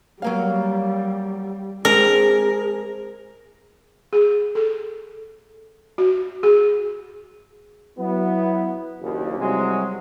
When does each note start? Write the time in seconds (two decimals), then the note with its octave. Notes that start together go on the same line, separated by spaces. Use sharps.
0.22 F#3 G3 A#3 F5
1.85 G#3 C4 D4 G#4 A#4
4.13 G#4
4.55 A4
5.98 F#4
6.43 G#4
7.98 F#3 B3 E4
9.01 F#1 D#2
9.38 C2 C3 F#3 G#3